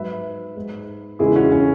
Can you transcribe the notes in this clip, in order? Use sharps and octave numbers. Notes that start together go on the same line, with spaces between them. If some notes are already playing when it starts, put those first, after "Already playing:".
Already playing: G#2 F#3 B4 E5
G#2 G#3
E2 C#3 E3 G#3 E4 G#4
C#4 F#4
C#4